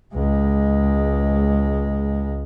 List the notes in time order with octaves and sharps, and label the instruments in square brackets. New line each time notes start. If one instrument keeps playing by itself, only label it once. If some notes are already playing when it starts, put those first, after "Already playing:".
[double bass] C#2 G#3